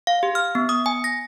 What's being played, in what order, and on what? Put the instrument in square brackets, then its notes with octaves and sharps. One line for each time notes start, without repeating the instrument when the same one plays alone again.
[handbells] F5
G4
F6
B3
D#6
G#5
A#6